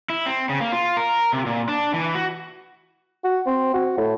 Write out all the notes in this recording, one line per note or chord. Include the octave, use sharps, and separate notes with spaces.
E4
C4
C#3
A#3
F4
A#4
C3
A#2
D4
E3
F#4
F#4
C4
F#4
A2